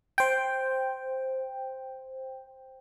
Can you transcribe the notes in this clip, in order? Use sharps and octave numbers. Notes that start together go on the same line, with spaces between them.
C5 G5